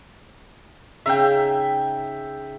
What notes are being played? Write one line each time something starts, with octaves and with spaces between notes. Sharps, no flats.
C#3 D#4 E5 F5 G5